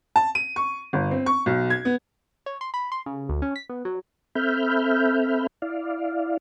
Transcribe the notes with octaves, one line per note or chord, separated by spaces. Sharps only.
A5
D#7
C#6
G1
C4
C#6
B1
G#6
B3
C#5
C6
B5
C6
C#3
D2
C#4
B6
B3
F#3
C4 A4 E5 B5 F6 G6
E4 D5 F5